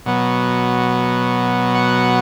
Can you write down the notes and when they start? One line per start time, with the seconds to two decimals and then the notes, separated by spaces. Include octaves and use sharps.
0.06 B2 F#3 B3
1.75 F#5